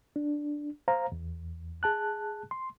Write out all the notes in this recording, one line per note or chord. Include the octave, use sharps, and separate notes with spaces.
D4
C5 F5 A#5
E2
G#4 A5 F#6
C6